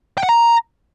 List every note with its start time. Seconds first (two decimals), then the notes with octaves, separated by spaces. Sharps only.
0.18 G5
0.23 F#5
0.29 A#5